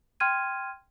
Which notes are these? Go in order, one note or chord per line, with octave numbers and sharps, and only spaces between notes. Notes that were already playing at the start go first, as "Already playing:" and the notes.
G5 C6 F6 G#6 D#7